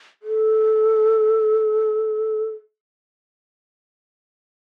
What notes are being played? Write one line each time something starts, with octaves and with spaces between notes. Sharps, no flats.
A4